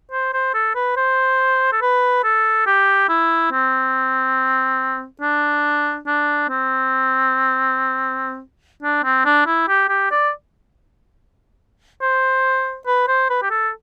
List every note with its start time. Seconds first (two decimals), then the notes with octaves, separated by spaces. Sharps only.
0.12 C5
0.33 C5
0.54 A4
0.75 B4
0.97 C5
1.72 A4
1.82 B4
2.24 A4
2.67 G4
3.09 E4
3.52 C4
5.21 D4
6.07 D4
6.49 C4
8.83 D4
9.04 C4
9.26 D4
9.46 E4
9.68 G4
9.89 G4
10.11 D5
12.02 C5
12.87 B4
13.08 C5
13.30 B4
13.42 G4
13.51 A4